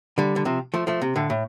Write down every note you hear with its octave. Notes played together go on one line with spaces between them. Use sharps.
D3 G3
D3
C3 F3
F3 A3
F3 A3
C3
A2 D3
A2